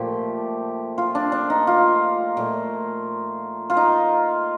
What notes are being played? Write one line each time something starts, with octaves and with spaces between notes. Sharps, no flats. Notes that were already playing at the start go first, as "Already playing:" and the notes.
Already playing: A#2 F3 A3 G4
F4
D4
D4
D#4
F4
A#2 A3
F4
D#4